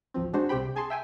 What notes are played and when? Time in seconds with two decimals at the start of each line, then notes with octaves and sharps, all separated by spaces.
0.14 A1 D2 F3 C4
0.33 G#3 D4 F#4 C5
0.49 C2 C3 G4 C5 G5 B5
0.76 G#4 G#5 A5 C6
0.90 E5 G5 G#5